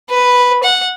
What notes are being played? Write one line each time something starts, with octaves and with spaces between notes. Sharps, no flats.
B4
F#5